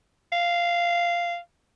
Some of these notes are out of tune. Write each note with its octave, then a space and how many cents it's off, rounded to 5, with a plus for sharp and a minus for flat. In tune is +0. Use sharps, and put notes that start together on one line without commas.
F5 -10